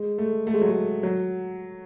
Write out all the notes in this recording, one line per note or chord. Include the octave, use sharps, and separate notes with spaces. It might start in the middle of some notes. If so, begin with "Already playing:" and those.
Already playing: G#3
A3
A3
G#3
F#3
G#3
F#3